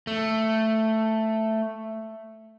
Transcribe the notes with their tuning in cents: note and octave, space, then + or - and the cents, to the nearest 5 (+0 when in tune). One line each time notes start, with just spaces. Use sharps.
A3 +5